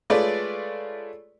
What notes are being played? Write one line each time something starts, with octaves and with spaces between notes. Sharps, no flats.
G#3 A3 F4 B4 C#5 D5